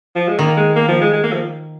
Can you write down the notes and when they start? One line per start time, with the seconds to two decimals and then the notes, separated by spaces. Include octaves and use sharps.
0.16 F3
0.28 G#3
0.38 D#3 A#3
0.57 G#3
0.76 A#3
0.88 F3
1.01 G#3
1.13 G#3
1.23 A#3
1.33 F3